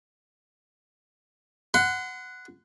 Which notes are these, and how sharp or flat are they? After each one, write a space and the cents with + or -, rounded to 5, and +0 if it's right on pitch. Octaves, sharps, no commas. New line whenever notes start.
F#5 +0 C6 -35